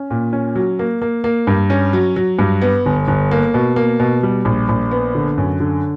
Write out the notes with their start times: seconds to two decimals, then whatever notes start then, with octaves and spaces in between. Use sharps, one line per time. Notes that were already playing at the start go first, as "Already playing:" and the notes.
Already playing: C#4
0.11 A#2
0.33 C#4
0.55 F#3
0.79 A#3
1.02 A#3
1.24 A#3
1.47 G2
1.70 C#4
1.93 F#3
2.16 F#3
2.39 G2
2.62 B3
2.86 G1
3.08 G1
3.31 A#3
3.54 B2
3.76 A#3
4.00 B2
4.23 G3
4.45 A#1
4.69 A#1
4.91 B3
5.15 D3
5.38 F#2
5.60 D3